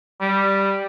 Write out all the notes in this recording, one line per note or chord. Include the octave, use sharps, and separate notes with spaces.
G3